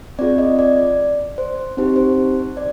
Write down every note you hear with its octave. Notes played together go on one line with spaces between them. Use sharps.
C4 F4 G#4 D5
D#5
D5
D5
C5
C4 D#4 G4 C5
C5
D5